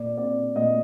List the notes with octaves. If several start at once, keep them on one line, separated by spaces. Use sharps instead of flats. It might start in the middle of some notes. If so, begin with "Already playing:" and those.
Already playing: A#2 D5
C4 D5
A#2 D#5